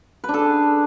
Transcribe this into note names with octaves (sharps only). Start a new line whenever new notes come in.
B4
D4
A4
G#4